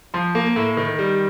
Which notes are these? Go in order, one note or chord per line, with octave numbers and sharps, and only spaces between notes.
F3 C6
A#3
A2
D#3
G3